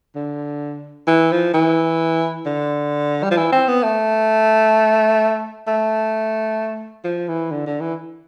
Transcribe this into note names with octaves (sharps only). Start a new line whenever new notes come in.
D3
E3
F3
E3
D3
G3
F3
E3
C4
B3
A3
A3
F3
E3
D3
D3
E3